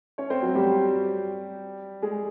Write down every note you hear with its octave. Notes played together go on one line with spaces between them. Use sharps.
C#4 C#5
C4 C5
F#3 F#4
G3 G4
G#3 G#4